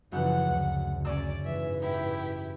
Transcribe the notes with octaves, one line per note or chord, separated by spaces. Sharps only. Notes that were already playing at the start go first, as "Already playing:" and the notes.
F#2 C#3 E3 F3 F#5 F#6
D2
C#4 D5 E6
G#2 E3 E5
E4 G4